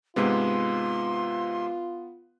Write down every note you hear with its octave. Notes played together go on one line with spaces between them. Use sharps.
G#2 C3 G#3 B3 F4 C6